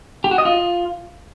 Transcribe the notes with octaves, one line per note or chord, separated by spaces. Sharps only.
G4
F#4
D#5
F4